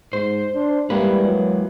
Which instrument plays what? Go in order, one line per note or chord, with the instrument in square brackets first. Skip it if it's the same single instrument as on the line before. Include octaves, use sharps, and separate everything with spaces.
[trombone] G#2 [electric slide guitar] C5
[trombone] D4
[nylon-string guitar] E3 A#3 [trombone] G3 [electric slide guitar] G#3 B4
[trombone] F#3